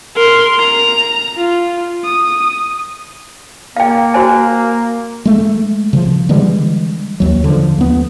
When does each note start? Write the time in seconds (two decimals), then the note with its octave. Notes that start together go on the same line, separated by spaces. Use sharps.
0.16 A#4 C6
0.59 A#5
1.38 F4
2.05 D#6
3.77 A#3 F5 G5
4.14 F#4 C5 G#5
5.25 G#3 A3
5.93 C#3 E3 F3
6.29 D3 E3 G3 G#3
7.20 D#2 F#3
7.44 D3 F3
7.78 D#2 B3